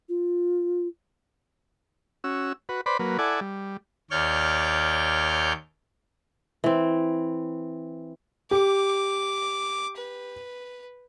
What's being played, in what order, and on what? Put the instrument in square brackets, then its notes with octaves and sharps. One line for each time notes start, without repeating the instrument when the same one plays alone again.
[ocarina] F4
[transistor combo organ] C#4 F#4 E6
F#4 B4
B4 C5 D5 B5
F#3 A#3 B4
E4 A4 D5 F#5 G#5
G3
[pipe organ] D#2 C#5 D5 F6 G6
[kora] E3 C4
[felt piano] G4 [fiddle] D6
[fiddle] B4